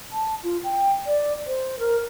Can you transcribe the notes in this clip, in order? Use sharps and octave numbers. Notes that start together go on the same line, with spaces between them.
A5
F4
G5
D5
C5
A#4